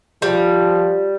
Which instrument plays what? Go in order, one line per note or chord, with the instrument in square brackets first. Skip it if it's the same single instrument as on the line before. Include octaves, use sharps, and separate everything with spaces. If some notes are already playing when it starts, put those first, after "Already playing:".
[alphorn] F3 [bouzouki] G3